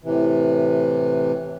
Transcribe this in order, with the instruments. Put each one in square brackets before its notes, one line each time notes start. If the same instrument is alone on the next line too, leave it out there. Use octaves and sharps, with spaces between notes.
[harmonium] A2 C3 E3